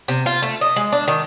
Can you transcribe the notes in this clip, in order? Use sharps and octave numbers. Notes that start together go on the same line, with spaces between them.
C3
F4
A3
D#5
G#3
D4
D#3